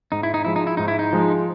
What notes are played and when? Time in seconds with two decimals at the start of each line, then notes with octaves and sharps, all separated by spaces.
0.12 G#2 D#4
0.23 E4
0.34 D#4
0.45 F3 G#3 E4
0.56 D#4
0.67 E4
0.77 G#2 D#4
0.88 E4
0.99 D#4
1.13 F3 G#3